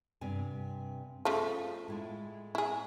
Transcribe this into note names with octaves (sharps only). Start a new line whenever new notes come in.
G2 C3 G#5
C#3 F3 A3 A4
A2 G#3 E4
E4 G#4